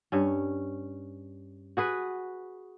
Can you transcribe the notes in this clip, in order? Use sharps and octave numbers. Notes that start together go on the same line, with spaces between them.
G2 C#4
F#4 G#4 B4